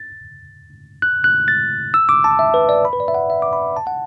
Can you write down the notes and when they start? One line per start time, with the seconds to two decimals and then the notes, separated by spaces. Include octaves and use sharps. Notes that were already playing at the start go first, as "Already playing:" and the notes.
Already playing: A6
1.02 F#6
1.24 F#6
1.48 A6
1.94 E6
2.09 D6
2.24 A5
2.39 E5
2.54 B4
2.69 D5
2.85 B5
2.93 B4
3.00 D5
3.08 E5
3.14 F#5
3.30 E5
3.42 D6
3.53 B5
3.77 A5
3.87 F#5